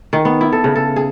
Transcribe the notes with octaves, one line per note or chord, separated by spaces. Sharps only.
D#3
B3
E4
A4
C#3
A4
G#4